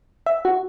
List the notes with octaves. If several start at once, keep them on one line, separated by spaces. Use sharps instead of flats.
E5
F#4